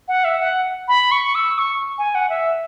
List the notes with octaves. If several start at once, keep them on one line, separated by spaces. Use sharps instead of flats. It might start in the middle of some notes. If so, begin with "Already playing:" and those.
F#5
E5
F#5
B5
C#6
E6
C#6
G#5
F#5
E5